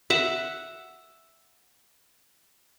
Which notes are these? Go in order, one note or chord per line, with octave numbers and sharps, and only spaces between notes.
E5 F#5